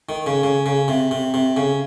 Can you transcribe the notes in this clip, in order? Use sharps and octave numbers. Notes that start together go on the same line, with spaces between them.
D#3
C#3
C#3
C#3
C3
C3
C3
C#3